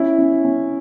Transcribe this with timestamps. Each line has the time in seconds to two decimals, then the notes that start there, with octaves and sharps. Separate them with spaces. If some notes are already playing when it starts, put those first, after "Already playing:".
Already playing: C#4 E4
0.18 C#4
0.45 C#4